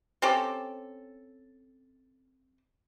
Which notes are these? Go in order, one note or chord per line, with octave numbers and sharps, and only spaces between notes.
C4 C#4 G4 A4